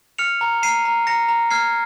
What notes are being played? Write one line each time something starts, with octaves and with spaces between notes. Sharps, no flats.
F6 C#7 F7
A#5
A#5 C7 D#7
A#5
A#5 A#6 C#7
A#5
F6 G#6 C7